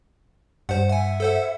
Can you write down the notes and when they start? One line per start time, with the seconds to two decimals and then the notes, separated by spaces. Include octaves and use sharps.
0.69 G2 C5 F#5
0.89 E5 F#5 G#5
1.20 A4 C5 F#5